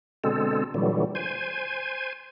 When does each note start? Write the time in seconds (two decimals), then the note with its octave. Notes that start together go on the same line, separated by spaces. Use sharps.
0.24 B2 D3 G#3 C4 A4
0.74 A#2 D3 E3 F#3 G3
1.15 C5 G#5